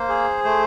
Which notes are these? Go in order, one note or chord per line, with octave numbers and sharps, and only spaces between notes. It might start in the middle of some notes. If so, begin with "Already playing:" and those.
Already playing: A#3 C5
G#4
A3 C5